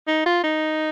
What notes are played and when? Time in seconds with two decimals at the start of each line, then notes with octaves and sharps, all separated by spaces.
0.08 D#4
0.26 F4
0.44 D#4